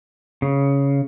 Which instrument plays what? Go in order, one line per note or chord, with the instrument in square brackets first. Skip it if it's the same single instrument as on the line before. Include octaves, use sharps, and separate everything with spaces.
[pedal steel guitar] C#3